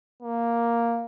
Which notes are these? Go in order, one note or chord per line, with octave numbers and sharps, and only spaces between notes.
A#3